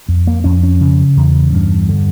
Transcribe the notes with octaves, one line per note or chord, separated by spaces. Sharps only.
F2
A#3
F2 C#4
C#4
C#3
E2
G2
D3